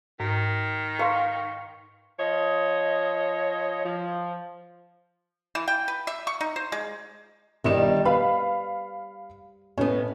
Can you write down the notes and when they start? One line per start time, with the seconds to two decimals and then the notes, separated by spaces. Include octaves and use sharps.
0.20 G#2 D#3
0.99 B4 F5 C6 C#6
2.19 F3 C#5 D#5
3.84 F3
5.55 E3
5.68 G5
5.88 B4
6.07 E5
6.27 C#6
6.41 D#4
6.56 C5
6.72 G#3
7.64 G1 D#3 G3 E4 E7
8.05 B4 F5 B5
9.78 A2 B3 C#4